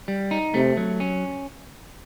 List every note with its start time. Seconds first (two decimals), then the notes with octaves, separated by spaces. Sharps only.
0.08 G3
0.31 D#4
0.54 C3 A3
0.77 F#3
1.00 C#4